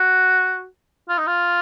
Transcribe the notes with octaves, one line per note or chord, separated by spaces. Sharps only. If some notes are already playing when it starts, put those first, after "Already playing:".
Already playing: F#4
F4
D#4
F4